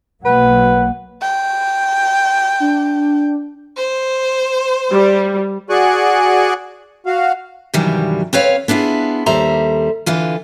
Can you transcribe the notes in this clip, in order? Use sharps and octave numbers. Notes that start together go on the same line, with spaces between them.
B1 F#3 A#3 B4 F#5
G5
D4
C5
G3
F#4 G#4 D5 G#5 C#6 F#6
F#4 F5
G2 C3 D#3 E3 F#3 G3
C4 B4 C#5 F5
B3 D4 E4 F4 G#4
D#2 G3 A4 C5 E5 A#5
D3 E3 F4 B4